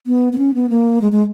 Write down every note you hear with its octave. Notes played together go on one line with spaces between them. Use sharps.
B3
B3
C#4
B3
A#3
G#3
G#3